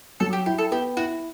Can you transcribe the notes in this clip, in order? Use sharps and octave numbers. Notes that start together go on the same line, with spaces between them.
F#3 A4
G4
E4 G4
A4
B3 G4
E4 F#4